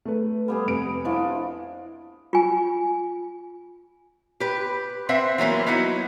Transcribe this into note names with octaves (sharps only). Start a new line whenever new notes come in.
A3 B4
G3 B3 G#4
F1 D7
F3 D4 E4 D#5
F4 G#5
G4 B4
C4 B4 C5 E5 F#5
E3 F#3 A#3 B3
F#3 B3 D#4 E4 F#5